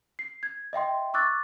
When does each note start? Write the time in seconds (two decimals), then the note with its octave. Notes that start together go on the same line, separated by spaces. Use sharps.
0.19 C7
0.43 G#6
0.73 D#5 E5 G5 C6
1.14 C#6 D6 E6 F#6 A6